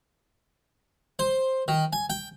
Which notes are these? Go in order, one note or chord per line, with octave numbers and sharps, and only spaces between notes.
C5
D#3
G#5
G5